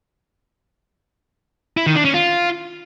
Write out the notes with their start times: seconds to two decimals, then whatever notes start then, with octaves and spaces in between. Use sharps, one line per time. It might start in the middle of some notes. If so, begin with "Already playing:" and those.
1.77 E4
1.86 D#3
1.96 D4
2.05 C#4
2.14 F4